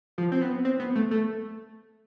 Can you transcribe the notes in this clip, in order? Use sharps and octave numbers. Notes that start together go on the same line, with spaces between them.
F3
C4
B3
C4
B3
A3
A3